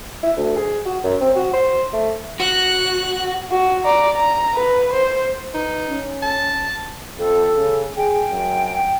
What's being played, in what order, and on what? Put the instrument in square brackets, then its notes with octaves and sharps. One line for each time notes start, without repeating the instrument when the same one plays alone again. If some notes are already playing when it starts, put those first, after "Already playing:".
[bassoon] E4
D2
G#4
F#4
F#2
C4
F#4
C5
A3
[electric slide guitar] F#4 [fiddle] F#6
[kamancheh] F#4
D5 A#5
A#5
B4
C5
[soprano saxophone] D#4 [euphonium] B4
[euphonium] C#4
[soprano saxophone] A5
[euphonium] F2 [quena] A4
[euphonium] C#3
[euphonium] G#4 [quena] G5
[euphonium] F#2